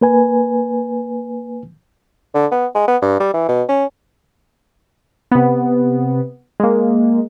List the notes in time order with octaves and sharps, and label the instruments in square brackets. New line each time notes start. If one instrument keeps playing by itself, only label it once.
[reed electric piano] A#3 B4 G#5
[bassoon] D3
B3
G#3
B3
G2
G3
E3
B2
C#4
[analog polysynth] C3 B3
G#3 A#3